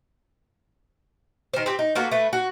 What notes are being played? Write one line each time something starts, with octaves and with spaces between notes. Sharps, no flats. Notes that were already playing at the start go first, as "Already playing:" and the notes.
D#3 C5
C4 G4
D#4
A#3 B3 F#4 A4
A3 B4
F#4